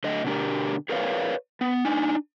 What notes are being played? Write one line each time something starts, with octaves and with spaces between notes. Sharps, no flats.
D3 F#3 A3 D#5
B2 D3 A3 D4 G4 A#4
G#4 A#4 B4 C#5 D5 F5
B3
D4 D#4 G#5